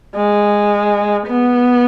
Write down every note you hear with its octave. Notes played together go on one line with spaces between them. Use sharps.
G#3
B3